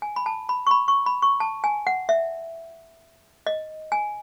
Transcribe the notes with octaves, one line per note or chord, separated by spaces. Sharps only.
G#5
B5
A5
B5
C#6
B5
C#6
B5
C#6
A5
G#5
F#5
E5
D#5
G#5